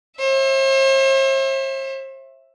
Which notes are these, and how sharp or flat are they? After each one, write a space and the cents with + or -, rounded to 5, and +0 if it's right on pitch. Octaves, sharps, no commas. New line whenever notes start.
C5 +45 E5 +0